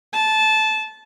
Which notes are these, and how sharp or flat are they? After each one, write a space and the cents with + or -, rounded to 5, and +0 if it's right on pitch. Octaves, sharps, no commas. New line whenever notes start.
A5 -15